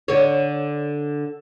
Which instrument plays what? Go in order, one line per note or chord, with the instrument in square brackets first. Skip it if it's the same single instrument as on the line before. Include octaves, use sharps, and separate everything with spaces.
[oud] D3 C#5